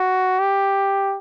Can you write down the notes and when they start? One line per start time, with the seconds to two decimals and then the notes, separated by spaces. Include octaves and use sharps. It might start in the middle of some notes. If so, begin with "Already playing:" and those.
Already playing: F#4
0.39 G4